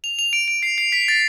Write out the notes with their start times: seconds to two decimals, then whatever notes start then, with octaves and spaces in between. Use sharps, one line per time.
0.04 F7
0.19 F7
0.33 D7
0.48 D7
0.63 C7
0.78 C7
0.92 B6
1.08 A6